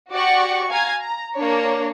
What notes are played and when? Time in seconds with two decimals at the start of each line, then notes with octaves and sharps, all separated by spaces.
0.13 F#4 G4 D5 F#5 C#6
0.71 F5 G#5 A#5 G#6
1.00 A#5
1.36 A#3 D4 C#5